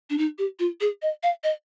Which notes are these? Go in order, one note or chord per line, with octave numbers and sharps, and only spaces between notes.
D4
D#4
G4
F4
G#4
D#5
F5
D#5